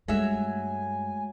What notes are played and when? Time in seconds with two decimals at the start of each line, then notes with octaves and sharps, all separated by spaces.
0.08 G2 F#3 G#3 A3 E5 G#5